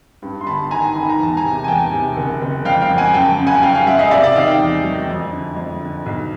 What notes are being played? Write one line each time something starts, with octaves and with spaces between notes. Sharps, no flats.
G2
C6
G1 A5 B5
D#3 G#5 A#5
D#3 B5
A#5
E2 A5
G#5 A#5
C3
G#5
E2 G5 A5
C3
F#1
F#1
F2 F5 G5
F5 G5
F2
F#5 G#5
F#2 G5 A5
C#3
F#5 G#5
F#2 F5 G5
F5 G5
F#2 E5 F#5
D#5 F5
C3 D5 E5
D5 E5
D#3 D#5 F5
F5 G5
E2
F#3
F2
D3
F2
D3
B1